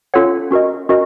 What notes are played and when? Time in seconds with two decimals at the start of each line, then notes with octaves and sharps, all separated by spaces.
0.14 C#4 F4 A4 C#5 F#5
0.51 C#4 F#4 A#4 D#5
0.89 C#4 F#4 A#4 D#5